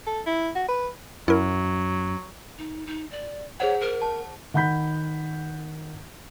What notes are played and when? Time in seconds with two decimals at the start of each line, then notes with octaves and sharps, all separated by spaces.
0.06 A4
0.26 E4
0.55 F#4
0.69 B4
1.28 F#2 F#3 E4 A#4
2.58 D#4
2.87 D#4
3.11 D5
3.60 G#4 C5 C#5 F#5
3.81 A#4
4.02 A5
4.54 D#3 F#5 B5 G6 B6